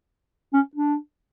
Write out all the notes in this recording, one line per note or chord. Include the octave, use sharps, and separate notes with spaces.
C#4
D4